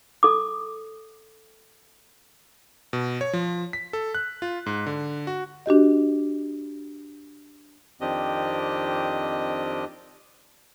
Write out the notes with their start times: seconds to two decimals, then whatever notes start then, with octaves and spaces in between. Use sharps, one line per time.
0.23 A4 D6
2.93 B2
3.21 C#5
3.33 F3
3.73 B6
3.93 A4
4.15 F#6
4.42 F4
4.66 G#2
4.86 D3
5.27 F#4
5.66 D4 F#4 G4 D#5
8.01 F2 D#3 C4 D4 G4 D#5